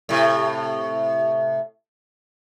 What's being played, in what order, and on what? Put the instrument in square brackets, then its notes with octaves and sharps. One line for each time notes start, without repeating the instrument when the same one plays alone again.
[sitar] A2 C3